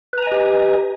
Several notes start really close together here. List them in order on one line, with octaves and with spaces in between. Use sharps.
B4 A#5 G#5 D#5 G4